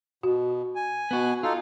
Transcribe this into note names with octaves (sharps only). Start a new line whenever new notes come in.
B2 F#4
G#5
B3 F#4
D#4 F4 A4